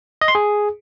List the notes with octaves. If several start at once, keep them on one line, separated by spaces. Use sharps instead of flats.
D#5
C6
G#4